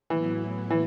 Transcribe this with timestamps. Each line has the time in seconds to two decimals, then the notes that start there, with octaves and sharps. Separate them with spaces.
0.10 A2 E3 F#3 B3 E4
0.70 E3